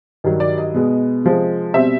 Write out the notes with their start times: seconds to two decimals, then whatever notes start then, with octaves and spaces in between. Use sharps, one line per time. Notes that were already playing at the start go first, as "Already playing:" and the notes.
0.24 G2 D#3 F#3
0.40 D5
0.58 D#5
0.74 B2 G#3 B3
1.24 C3 F3 G#3
1.74 B2 G3 C4 E5